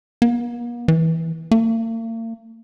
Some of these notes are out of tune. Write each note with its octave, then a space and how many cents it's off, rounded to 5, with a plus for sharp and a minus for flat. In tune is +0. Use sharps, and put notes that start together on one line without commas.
A#3 +45
E3 -15
A#3 -45